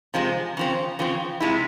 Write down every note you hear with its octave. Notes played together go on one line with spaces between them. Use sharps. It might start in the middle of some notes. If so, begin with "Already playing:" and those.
C3 F3 G#3
C#3 F3 C4
C#3 F3 C4
C3 F3 G#3 E4